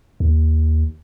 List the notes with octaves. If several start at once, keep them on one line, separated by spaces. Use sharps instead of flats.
D#2